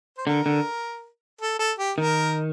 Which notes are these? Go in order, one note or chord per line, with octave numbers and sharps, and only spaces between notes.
C5
D3 A#4
D3
A4
A4
G4
D#3 A#4